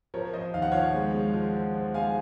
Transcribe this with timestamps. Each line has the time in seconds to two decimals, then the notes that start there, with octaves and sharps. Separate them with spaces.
0.14 F3 A#4 C#5
0.33 F3 C5 D#5
0.54 D#2 F5
0.62 F#5
0.71 F3 C#5 F5
0.94 G#3
1.14 G#3
1.33 F3
1.54 F3
1.74 F3
1.94 G#3 F5 G#5